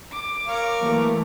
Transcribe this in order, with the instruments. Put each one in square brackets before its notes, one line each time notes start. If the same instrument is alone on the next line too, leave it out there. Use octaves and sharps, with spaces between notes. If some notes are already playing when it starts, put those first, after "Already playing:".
[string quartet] D6
[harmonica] A#4 C#5 F5
[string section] E3 F#3 A3 [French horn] A#3